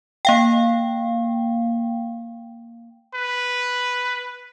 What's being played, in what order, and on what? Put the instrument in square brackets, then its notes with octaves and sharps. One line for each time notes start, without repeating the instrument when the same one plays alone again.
[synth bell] A#3 F5 G5
[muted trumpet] B4